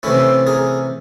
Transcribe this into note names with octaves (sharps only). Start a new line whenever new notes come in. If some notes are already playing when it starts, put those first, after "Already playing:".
C3 E3 A3 C#4 E4
G#4 A#4